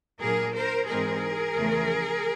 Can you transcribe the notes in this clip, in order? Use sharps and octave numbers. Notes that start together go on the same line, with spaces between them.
A#2 F#3 A#3 D4 G#4 A#4
A#4 C5
G#2 E3 G#3 C4 D#4 G#4 A#4
E2 C#3 F3 A3